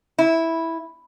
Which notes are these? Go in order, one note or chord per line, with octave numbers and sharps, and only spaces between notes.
E4